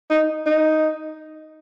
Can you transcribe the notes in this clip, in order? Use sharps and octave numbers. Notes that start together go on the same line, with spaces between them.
D#4
D#4